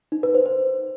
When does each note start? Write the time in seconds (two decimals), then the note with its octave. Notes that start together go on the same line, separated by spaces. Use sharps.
0.12 D#4
0.23 B4
0.34 C5
0.46 C5